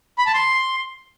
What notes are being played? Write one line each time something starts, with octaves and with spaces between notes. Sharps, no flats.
B5
A5
C6